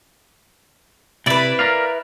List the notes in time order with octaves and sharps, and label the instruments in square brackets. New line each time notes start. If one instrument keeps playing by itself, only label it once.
[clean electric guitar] C3 D5 [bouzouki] E4 B4
[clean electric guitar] A#4 D5 F5